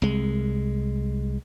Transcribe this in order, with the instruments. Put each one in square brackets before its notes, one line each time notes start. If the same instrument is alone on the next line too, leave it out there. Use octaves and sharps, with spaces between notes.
[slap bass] C2 G#3